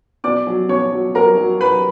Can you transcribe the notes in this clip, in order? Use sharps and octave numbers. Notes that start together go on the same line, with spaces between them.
B2 D5 D6
F#3
B2 C#5 C#6
F#3
F#3 A#4 A#5
F#3
F#3 B4 B5